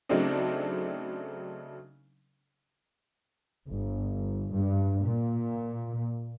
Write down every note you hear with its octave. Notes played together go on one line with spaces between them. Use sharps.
C#3 F#3 A3 C4 D4 D#4
G1
G2
A#2